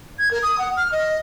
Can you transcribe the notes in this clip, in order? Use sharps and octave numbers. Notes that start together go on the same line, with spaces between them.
G#6
A#4
D#6
F#5
F6
D#5